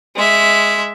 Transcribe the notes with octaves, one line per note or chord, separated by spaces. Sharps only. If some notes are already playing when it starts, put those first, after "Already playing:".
G#3 E5